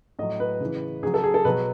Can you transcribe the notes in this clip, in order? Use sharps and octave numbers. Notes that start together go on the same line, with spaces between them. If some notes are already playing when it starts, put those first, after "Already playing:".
A2 F#3 D#5
B4
C#3 E3
C#3 F#3 G#4
A4
G#4
A4
B2 F#3 B4